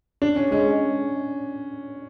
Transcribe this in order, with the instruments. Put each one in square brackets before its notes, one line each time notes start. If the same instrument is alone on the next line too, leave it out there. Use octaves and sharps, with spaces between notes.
[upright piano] D4
C#4
[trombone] G#3 [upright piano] C#4